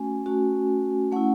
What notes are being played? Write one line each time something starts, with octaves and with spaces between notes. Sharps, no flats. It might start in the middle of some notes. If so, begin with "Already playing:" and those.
Already playing: A3 C#4 F#4 G#5
A3 C#4 F#4
A3 C#4 E4 F#5